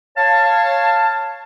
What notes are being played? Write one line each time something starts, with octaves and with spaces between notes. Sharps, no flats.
C#5 F5 A5